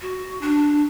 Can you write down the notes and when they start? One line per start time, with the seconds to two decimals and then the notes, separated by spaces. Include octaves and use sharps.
0.01 F#4
0.41 D4